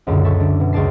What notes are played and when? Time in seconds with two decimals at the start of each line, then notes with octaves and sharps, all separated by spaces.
0.07 C#2 F#2 A#2 D3
0.24 A4 C#5 E5 C#6
0.40 D3 D4
0.60 B2
0.73 C#2 C#5 D5 A5 C7